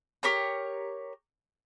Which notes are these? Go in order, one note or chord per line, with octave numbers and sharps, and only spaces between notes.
G4 A#4 C#5 F6